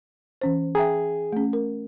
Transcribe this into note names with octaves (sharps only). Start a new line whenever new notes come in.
E3 C#4 C5
G#4 E5 G5 A#5
A3 C#4
A#4